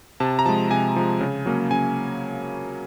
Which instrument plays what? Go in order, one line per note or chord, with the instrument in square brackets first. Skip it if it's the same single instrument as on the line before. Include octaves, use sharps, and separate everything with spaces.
[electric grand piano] C3 A5
A#5
F3 G#3 A5
C3 G#5
F3 G#3
C#3
F#3 A#3 C#4
C#3 G#5